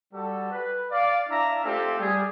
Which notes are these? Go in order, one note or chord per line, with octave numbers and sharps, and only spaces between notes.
G3 F#4 A4
B4
D5 F5
D4 E4 D5 E5 F5 A#5
A3 C4 F4 G4 A4
G3 G#4